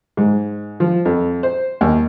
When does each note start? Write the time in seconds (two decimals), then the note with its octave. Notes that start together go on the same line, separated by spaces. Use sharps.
0.17 G#2
0.80 F3
1.05 F2
1.43 C5
1.81 D#2